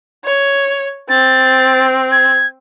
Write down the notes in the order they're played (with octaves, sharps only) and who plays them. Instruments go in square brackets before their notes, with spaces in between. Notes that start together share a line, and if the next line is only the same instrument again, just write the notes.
[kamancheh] C#5
[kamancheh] C4 [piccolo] A6
[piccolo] G#6